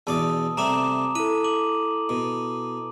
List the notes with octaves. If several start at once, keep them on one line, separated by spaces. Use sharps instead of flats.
E2 B2 D5 A5 D#6 E6
C3 G3 A3 A#5 D6 E7
E4 A4 B5 D#7
D6 D#7 F#7
B2